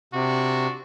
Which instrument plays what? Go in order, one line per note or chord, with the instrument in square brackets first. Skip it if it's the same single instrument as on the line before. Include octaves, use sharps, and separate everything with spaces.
[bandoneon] C3 [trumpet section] D4 F#4